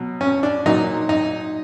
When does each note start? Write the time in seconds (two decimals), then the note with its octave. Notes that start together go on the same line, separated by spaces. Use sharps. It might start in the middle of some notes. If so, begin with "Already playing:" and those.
Already playing: B2 F#3
0.21 C#4
0.43 D4
0.66 A#2 F#3 D#4
1.09 D#4